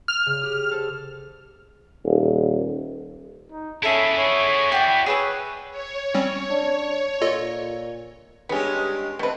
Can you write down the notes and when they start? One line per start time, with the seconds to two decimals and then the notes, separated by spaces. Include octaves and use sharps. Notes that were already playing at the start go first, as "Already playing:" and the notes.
0.08 F6
0.26 C#3
0.41 G4 D#6
0.71 A4 C5
2.05 D#1
3.51 D#4
3.83 C#4 E4 G#4 A4 E5 B5
4.19 C#5
4.72 F#4 D5 G5
5.06 G#4 B4 C#5 E6
5.71 C#5
6.15 G3 C4 C#4
6.50 D4
7.22 A#2 F4 A4 D#5
8.49 G2 G#3 B3 C#4 G4
9.19 B2 A3 C4 B4